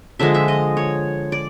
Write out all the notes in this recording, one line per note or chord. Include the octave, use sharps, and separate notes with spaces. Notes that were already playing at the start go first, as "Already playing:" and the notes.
D3 F3 G#3 E5
E5
D#5
C#5
D5